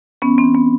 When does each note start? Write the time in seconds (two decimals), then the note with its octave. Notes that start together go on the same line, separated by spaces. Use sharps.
0.22 E3 B3 C#4
0.38 C4
0.44 E3
0.55 B3